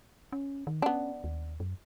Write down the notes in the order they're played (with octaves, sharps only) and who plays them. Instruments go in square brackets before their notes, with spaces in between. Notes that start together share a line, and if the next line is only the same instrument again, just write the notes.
[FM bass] C#4
D#3
[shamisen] B3 D4 [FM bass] C#4
[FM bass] D#2
F#2